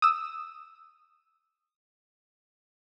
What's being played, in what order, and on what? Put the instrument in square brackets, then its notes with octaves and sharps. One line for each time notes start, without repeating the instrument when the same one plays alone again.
[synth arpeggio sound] D#6 E6